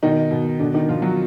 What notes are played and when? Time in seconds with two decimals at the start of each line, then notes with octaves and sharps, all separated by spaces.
0.03 B2 D#3 D#4
0.31 B2
0.59 B2 D3 D4
0.74 D#3 D#4
0.88 B2 F3 F4
1.02 F#3 F#4